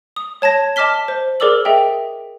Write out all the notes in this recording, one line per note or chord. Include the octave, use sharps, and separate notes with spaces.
D#6
C#5 A5 G#6 A#6
D#5 A5 D6 F6 B6 G7
C5
G#4 A#4 D5 D6 E6 F#7
G#4 D#5 E5 G5